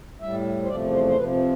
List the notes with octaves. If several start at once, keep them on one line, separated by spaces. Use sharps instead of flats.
A2 G3 E5
C5
E2 C3 F3 A3 D5
C5
C5
F2 C3 F3 B4